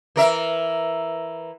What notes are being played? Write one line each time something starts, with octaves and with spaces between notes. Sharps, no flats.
E3 A#4 E5